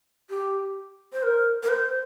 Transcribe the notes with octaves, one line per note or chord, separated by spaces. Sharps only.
G4
C5
A#4
A#4
C5